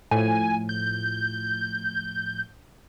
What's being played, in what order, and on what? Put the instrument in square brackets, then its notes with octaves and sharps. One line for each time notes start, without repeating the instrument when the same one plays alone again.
[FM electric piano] A2 F3 [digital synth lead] G#5
[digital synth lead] G6